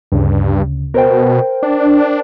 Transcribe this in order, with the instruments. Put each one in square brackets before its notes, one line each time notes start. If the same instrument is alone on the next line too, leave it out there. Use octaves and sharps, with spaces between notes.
[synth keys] D2 C#3 [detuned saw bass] G2
[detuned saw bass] B2 [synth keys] A#4 C5 G5
[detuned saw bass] D4